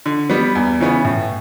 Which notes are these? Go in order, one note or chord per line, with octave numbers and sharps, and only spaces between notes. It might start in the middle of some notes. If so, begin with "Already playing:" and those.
D3
G3 B3
E2
C#3 E3 B3
A2